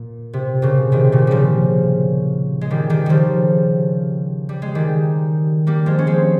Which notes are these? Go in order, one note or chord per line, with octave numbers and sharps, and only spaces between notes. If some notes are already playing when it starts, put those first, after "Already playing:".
Already playing: A#2
C3
A#2 C#3
C3 D#3
A#2 C#3
C#3 F3 G3
G#3
D#3 G3
D#3 G3
C#3 F3 G3
G3
G#3
D#3 G3
G3 A#3
F3 G#3
C#4
G#3 C4